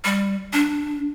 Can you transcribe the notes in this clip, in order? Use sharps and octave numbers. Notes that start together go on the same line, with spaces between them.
G3
D4